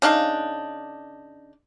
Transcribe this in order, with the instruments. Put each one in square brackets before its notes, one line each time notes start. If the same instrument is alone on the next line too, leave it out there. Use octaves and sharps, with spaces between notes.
[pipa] C#3 D4 D#4 F5